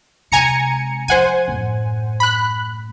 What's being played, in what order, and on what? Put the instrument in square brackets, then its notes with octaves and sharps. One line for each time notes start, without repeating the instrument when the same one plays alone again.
[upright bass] C3 G#3 [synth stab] G#5 A#5 C#7
[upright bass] F3 [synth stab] C5 F#5 G#5
[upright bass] F#2 A2
[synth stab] B5 F#6